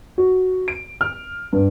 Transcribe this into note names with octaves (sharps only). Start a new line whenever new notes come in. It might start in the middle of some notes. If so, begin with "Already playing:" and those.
F#4
D7
F6
G2